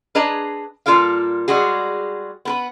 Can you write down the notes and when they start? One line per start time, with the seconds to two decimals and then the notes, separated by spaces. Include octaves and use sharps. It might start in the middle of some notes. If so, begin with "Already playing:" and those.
0.15 D4 G#4 B4 D#5 G#5 A#5
0.86 A#2 G3 F4 A4 A#4 F5
1.48 G3 G#3 F#4 G#4
2.45 B3 A#4 B4